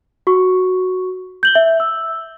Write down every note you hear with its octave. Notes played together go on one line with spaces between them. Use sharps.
F#4 C#6
G6 F#7 G7
E5
E6